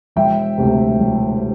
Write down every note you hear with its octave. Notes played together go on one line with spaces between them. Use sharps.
E1 E5 G5
D2 C3
E1